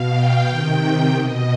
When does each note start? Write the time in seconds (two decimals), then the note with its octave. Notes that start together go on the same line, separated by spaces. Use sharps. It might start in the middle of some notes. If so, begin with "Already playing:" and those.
Already playing: B2 F5
0.12 G5
0.47 C3 D#3
1.14 B2 D#5